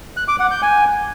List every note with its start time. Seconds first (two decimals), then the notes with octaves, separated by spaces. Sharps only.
0.17 F#6
0.28 D6
0.40 F#5
0.51 G6
0.62 G#5